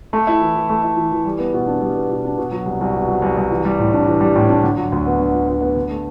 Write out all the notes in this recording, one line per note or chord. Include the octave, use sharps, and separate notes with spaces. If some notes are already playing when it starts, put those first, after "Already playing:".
A3
E4
E3
E3
A3
E4
E3
E3
G3
B3
B2
D4
G3
B3
B2
D4
B2
F#3
C2
C2
B2
F#3
C2
C2
E3
G3
A2
D4
E3
G3
A2
D4
D3
F#3
D2
B3
D3
F#3
D2
B3
D3
A3